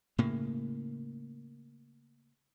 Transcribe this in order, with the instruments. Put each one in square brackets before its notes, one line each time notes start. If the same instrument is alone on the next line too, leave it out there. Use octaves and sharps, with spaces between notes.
[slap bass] A2 C#3 A#3